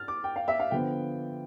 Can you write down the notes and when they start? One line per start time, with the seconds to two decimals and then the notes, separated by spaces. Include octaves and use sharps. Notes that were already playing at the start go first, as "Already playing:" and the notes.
Already playing: F6 A6
0.08 D6
0.24 G5
0.36 F5
0.48 E5
0.60 F5
0.71 D3 F3 B3 G5